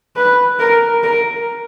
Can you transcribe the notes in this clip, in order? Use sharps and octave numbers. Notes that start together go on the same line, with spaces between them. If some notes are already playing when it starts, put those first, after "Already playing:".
B4
A#4
A#4